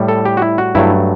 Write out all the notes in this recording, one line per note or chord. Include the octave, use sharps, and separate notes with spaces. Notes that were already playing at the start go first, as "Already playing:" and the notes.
Already playing: A2 G3
A4
G4
F#4
E4
F#4
G2 F#3 A3 E4